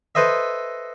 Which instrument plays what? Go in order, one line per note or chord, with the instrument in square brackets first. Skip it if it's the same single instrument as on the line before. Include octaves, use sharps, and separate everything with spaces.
[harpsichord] A4 B4 C5 D#5 E5